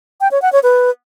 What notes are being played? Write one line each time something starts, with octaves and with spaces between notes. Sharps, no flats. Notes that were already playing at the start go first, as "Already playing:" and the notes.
G5
C#5
F#5
C#5
B4